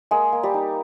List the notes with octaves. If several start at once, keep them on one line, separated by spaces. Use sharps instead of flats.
G#3 A#3 G#4
A#3
G3 G4
D#4